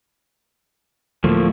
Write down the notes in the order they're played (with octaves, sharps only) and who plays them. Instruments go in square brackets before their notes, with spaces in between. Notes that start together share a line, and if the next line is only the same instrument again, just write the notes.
[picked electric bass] D2 A2 [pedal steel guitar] F3 A3 A#3